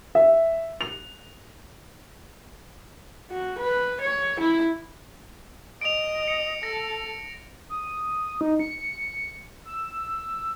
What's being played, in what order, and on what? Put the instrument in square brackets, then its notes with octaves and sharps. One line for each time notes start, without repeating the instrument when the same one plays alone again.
[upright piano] E5
F7
[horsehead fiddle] F#4
B4
C#5
E4
[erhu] D#5 [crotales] D7 F7
[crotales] C#7
[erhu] A4 [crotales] A#6
[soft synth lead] D#6
D#4
C#7
E6